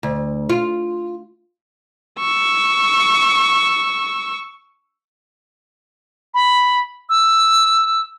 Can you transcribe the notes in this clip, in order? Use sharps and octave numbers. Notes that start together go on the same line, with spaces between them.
D2
F4
C#6 E6
B5
E6